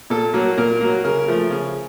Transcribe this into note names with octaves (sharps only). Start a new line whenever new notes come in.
A#2 A4
F#3 A#3
A#2 A#4
F#3 A#3
C#3 A#4
F3 A3
C#3